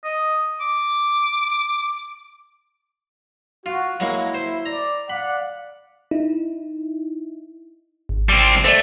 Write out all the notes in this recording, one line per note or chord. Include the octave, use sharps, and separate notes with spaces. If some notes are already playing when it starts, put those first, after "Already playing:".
D#5
D6
F4 F#4
F#3 G#3 A#3 E4
C5
D5 A#5
D5 F5 F#5 B5
D#4 E4
G#1
G3 C4
A3 C5 D5